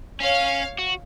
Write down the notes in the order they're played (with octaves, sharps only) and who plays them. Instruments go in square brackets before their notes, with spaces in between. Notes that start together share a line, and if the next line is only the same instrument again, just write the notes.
[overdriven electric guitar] C#4 [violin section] C#5 F5
[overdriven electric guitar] F#4